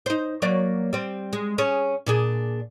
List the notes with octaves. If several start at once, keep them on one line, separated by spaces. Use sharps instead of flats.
D#4 C5
F#3 A#3 D5
G3 C4
G#3
C#4 G#4
A#2 D4 G#4